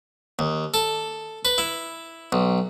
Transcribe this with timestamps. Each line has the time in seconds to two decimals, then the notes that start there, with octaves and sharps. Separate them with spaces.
0.39 D#2
0.74 A4
1.45 B4
1.58 E4
2.32 B1